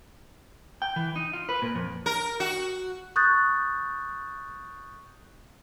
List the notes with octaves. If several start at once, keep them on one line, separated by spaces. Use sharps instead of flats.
G5
E3
D#4
F4
B4
A#2
F2
A#4
F#4
C#6 D#6 F#6 G6 A6